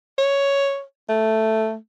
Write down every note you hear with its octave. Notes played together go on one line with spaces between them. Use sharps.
C#5
A3